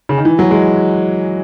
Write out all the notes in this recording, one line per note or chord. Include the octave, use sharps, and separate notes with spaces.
C#3
D#3
E3
F#3
G#3